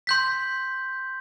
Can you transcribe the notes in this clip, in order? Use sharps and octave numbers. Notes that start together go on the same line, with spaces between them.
C6 G6 B6